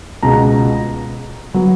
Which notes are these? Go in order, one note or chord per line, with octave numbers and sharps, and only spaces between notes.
C#2 B2 G#3 A#5
F#3 B3